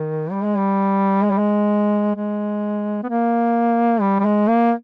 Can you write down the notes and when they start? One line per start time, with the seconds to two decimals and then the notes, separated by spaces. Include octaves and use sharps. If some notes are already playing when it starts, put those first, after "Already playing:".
Already playing: D#3
0.31 G3
0.44 G#3
0.58 G3
1.24 G#3
1.31 G3
1.39 G#3
2.16 G#3
3.03 B3
3.09 A#3
4.01 G3
4.20 G3
4.25 G#3
4.48 A#3